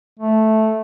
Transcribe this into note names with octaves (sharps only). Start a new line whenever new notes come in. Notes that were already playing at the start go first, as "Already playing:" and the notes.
A3